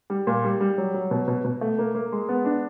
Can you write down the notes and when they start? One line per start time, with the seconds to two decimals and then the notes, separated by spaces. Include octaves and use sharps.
0.10 G3
0.27 A#2
0.44 G3
0.61 G3
0.78 F#3
0.94 F#3
1.11 B2
1.28 B2
1.44 B2
1.61 A3
1.78 A#3
1.95 A#3
2.12 G#3
2.29 B3
2.45 D4